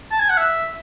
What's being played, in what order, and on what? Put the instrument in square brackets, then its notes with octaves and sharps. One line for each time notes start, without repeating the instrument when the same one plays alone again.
[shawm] A5
G#5
F#5
E5